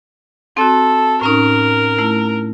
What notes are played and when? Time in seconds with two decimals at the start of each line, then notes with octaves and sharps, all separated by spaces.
0.57 C4 F#4 A4
1.21 A2 C#4 D#4 A#4
1.99 A3 E4